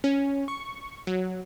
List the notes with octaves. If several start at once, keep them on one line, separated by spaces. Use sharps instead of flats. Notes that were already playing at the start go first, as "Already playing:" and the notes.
C#4
C#6
F#3